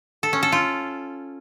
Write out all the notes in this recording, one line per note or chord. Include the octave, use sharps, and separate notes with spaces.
A4
C#4
A4
F4